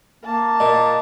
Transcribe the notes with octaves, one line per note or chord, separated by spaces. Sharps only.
A#3 A5
A#2 D#5